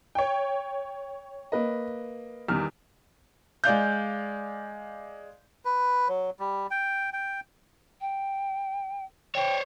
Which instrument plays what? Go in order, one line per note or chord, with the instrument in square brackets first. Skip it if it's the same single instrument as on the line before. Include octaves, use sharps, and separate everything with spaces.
[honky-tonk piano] C#5 G5
[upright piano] A#3 B4 D#5
[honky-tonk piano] E2 [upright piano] D#3 G3 F6
[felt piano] G#3 D5 F5 G6
[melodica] B4
F#3
G3
G5
G5
[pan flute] G5
[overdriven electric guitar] C5 C#5 [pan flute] G5